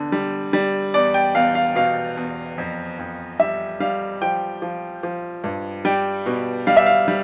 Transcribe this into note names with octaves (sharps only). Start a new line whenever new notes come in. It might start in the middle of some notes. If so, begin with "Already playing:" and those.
Already playing: E2 D3
G3
G3
E2 D5
G5
E2 F5
F5
B2 F5
E2
F2
F2
G3 E5
G3 F5
F3 G5
F3
F3
G2
G3 G5
B2
G3 F5
E5
F5
G3